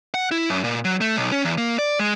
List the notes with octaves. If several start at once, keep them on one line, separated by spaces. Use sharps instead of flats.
F#5
E4
F#2
A#2
F#3
A3
B1
C#4
E2
A#3
D5
G#3